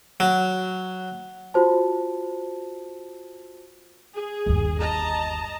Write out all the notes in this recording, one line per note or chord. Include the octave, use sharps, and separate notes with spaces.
F#3
F4 F#4 C5 A5
G#4
G1 D#2
D#5 A5 A#5